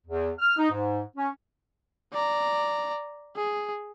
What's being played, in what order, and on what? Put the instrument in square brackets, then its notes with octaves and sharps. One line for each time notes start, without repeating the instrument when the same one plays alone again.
[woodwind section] E2
F6
D#4
G#2
C#4
[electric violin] D5 A#5
G#4